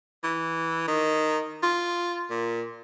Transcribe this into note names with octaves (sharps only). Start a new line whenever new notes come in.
E3
D#3
F4
A#2